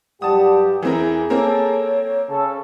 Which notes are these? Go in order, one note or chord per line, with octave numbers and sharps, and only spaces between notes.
G2 F#3 G3 G4 F#5 A5 D#6
E2 E3 C4 E4 G#4 A#4
A#3 C4 A4 A#4 C#5
C#3 C#4 A4